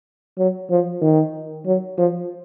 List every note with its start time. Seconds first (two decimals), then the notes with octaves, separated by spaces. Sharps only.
0.38 F#3
0.70 F3
1.02 D#3
1.66 F#3
1.98 F3